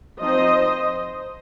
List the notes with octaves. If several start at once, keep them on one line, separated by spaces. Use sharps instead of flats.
F3 C4 D#4 C5 D#5